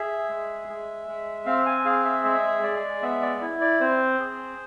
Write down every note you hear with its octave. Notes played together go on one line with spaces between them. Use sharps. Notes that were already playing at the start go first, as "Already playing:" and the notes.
Already playing: G#4 E5
G#3
G#3
G#3
C4 F5
G#5
G#4 F5
E5
G#3 E5
G#3 D5
B3 E5
D5
E4
D5
C4 C5
G#4